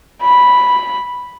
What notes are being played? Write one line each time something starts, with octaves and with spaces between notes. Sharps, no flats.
B5